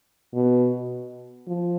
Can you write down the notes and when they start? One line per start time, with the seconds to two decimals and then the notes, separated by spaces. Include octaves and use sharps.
0.34 B2
1.47 F3